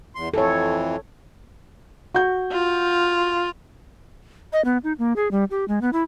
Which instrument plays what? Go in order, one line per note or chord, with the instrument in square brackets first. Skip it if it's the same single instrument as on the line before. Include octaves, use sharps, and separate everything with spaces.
[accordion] E2 C6
[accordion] F2 E3 [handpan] A4 C#5
[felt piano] F#4 G6
[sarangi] F4
[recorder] D#5
B3
D#4
A#3
G#4
G3
G4
G#3
B3
E4